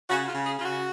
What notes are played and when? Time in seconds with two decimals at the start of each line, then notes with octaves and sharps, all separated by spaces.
0.10 C#3 F#4
0.28 F4
0.34 C#3
0.46 G#4
0.58 C#3 F4
0.64 F#4